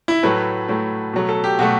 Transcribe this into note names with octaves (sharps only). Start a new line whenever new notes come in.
E4
A2 F#3 A3 B4
A2 F#3 A3
B2 F#3 A3
A4
G4
B2 F#3 A3 F#4